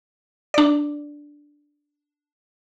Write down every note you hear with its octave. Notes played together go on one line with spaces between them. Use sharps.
D4 D5